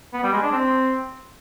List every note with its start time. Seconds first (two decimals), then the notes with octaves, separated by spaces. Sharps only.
0.13 B3
0.23 G3
0.33 G#3
0.42 D4
0.52 C4